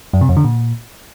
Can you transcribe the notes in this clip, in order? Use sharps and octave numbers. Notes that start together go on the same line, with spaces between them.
F#2
C3
F2
D3
A#2